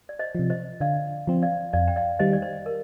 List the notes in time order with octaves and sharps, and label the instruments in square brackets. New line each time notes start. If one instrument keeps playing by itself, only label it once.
[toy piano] D5
C5 D#5
[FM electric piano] C3 F3
[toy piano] C5 D#5
[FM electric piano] D3 [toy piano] D5 F5
[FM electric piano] F3 C4
[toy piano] D5 F5
[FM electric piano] F2 [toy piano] D5 F5
[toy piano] G5
D5 F5
[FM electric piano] D#3 G3 [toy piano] C5 D#5
[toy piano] D5
C5
A#4